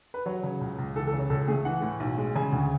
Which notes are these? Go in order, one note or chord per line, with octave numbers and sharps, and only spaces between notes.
B4
F#3 C#5
C#3
C#2
C#2
E3 A4
A4
C#3
C#5
C#2 A4
A3 G#4
E3 F#5
A2
B1
G#3
C#3 G#5
D2